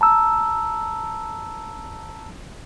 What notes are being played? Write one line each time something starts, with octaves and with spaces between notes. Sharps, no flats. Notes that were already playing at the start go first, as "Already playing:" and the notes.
A5 A#5 E6